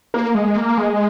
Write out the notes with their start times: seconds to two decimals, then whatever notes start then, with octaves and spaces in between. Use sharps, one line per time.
0.14 A#3
0.35 G#3
0.56 A#3
0.78 G#3